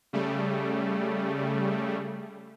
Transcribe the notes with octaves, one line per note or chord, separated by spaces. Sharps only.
C#3 G3 A3